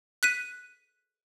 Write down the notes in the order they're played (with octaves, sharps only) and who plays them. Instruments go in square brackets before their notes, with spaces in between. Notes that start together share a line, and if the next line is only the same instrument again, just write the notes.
[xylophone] F#6 B6 D#7